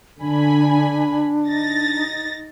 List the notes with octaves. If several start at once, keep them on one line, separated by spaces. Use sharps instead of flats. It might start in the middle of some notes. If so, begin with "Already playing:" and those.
D3 D4 G#5 B5
D#4 A6 A#6